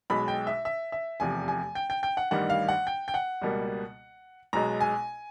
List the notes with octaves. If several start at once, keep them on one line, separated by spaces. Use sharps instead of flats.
B1 B2 G#3 B5
G5
E5
E5
E5
F1 E2 C3 F3 G#5
G#5
G5
G5
G5
F#5
A1 G2 D#3 G3 F#5
F5
F#5
G5
G5
F#5
C#2 B2 G3 A#3
B1 B2 G#3 A#5
G#5